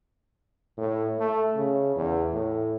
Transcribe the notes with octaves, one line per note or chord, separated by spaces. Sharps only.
A2
A3
C#3
E2
A2